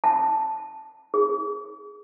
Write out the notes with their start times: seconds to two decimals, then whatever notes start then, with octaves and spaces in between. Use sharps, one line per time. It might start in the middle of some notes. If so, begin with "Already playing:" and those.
0.04 A5
1.14 G#4